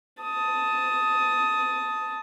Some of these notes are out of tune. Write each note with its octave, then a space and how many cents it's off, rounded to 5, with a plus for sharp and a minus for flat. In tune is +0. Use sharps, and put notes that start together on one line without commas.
A5 +0 D#6 +15